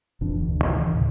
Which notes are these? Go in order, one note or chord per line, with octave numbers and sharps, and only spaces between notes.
F1 B2 E3 D4
D2
C3 D#3 E3
D2 A2 C#3